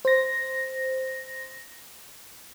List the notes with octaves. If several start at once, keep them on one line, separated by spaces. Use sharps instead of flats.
C5 A#6